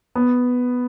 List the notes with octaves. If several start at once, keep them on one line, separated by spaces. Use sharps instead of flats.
B3